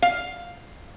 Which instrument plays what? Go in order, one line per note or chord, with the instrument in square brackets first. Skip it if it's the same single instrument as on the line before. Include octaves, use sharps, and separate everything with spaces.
[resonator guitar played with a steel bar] F5